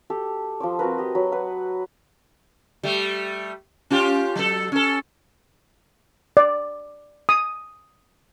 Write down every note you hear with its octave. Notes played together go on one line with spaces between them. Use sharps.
G4 A4
F3 C5 D6
C4 F#4 A#4 B4
G4 D#5
F#3 B5
B4 F#5
G3 A3
C#4 F4 G4
F#3 A4
C#4 A4
D5
D#6